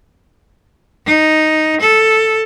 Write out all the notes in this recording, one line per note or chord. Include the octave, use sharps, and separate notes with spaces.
D#4
A4